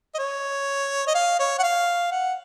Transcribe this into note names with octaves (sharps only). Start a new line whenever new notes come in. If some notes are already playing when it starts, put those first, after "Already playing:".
D#5
C#5
D#5
F5
C#5
F#5
F5
F#5